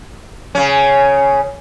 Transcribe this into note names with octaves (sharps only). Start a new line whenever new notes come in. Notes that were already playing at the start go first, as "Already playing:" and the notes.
C#3 C#4